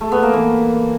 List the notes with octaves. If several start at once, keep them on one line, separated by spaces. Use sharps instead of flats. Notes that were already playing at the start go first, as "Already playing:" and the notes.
A3
B3
A#3
E3